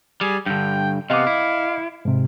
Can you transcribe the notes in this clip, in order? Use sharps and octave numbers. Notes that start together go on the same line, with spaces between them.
G3 G#4
G2 D3 G5
C3 B3 D#5 F5 D6
E4
G#2 C3